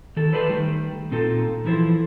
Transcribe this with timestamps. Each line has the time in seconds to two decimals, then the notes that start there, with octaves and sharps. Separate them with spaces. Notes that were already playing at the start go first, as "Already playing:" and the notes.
0.16 D#3 A4
0.33 A4 B4 C5 D5 E5 A5
0.48 D#3 G3 A3
1.11 A#2 C4 D#4 F4 A4
1.65 E3 F3 E4 A4 C5